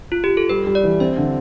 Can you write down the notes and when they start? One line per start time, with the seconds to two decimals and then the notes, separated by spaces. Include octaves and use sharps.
0.12 F4
0.24 G4
0.37 A4
0.49 G3 B4
0.67 G3
0.75 D5
0.83 E3
1.00 C4 E5
1.17 D3